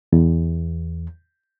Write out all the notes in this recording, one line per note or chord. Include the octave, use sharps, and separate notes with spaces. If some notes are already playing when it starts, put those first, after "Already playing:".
E2